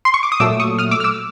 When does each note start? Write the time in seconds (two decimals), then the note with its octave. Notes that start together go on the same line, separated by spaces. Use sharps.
0.05 C6
0.14 C#6
0.23 D6
0.32 D#6
0.40 A#2 F#3 A3 D6 E6
0.60 C#6 D#6
0.79 D#6 F6
0.91 D6 E6
1.00 F6
1.04 D6 E6